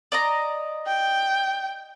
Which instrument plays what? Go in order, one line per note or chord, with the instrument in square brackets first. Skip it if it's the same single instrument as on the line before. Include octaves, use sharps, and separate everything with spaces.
[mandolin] D5 D#5 A#5
[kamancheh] G5